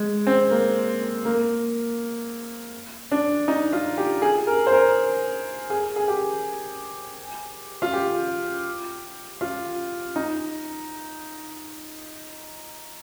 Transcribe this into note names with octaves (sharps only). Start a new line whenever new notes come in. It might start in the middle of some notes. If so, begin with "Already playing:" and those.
Already playing: G#3
C4
A#3
A#3
D4
D#4
F4
G4
G#4
A#4
C5
A#4
G#4
G#4
G4
F4
G4
F4
D#4